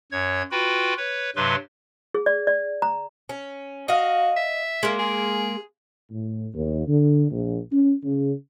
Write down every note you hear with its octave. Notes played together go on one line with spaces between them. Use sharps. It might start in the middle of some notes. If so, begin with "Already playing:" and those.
F#2 C#5 G#6
F4 F#4 B4 G5 B5
B4 C#5
G2 C3 F#3 B4 C6
G#4
D5
D5
A#5
C#4
F#4 D#5 F5
E5
G#3 A#3
G#4
A2
D#2
D3
A#1
C#4
C#3